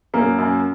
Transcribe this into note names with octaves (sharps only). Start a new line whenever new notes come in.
F#2 A#3
F#2